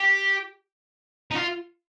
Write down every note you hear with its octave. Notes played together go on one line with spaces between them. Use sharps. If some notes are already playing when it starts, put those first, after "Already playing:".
Already playing: G4
D#4
F4